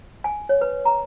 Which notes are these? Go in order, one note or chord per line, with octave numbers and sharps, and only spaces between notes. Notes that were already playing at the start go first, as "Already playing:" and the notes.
G#5
C#5
B4
A#5